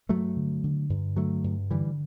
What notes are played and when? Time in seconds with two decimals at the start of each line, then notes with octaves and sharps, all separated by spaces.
0.09 G2 F#3 A3
0.36 D3
0.64 D3
0.90 G2
1.17 D3 F#3 A3
1.44 G2
1.71 D3 E3 G3